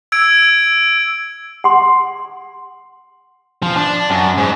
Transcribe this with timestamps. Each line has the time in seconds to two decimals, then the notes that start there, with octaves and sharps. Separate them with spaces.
0.12 E6 G#6 D7
1.64 F#5 C6
3.62 F3
3.76 D4
4.10 F#2
4.38 G#2